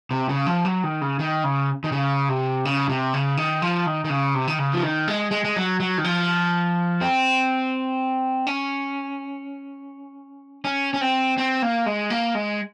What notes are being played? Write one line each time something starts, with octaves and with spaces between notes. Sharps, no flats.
C3
C#3
F3
F#3
D#3
C#3
D#3
C#3
D#3
C#3
C3
C#3
C3
C#3
D#3
F3
D#3
D#3
C#3
C3
D#3
C#3
F3
D#3
G#3
G#3
G#3
F#3
F#3
D#3
F3
C4
C#4
C#4
C#4
C4
C4
A#3
G#3
A#3
G#3